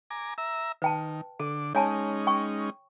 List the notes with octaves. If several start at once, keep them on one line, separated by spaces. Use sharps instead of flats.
G#5 A#5 D6
E5 A#5 E6
D#3 B4 G5 A5
D3 A4 D6
G#3 C#4 D#4 C#5 G#5 A5
G5 C#6